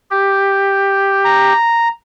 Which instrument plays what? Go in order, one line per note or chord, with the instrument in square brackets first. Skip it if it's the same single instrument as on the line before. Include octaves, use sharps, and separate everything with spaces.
[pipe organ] G4
[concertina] A#5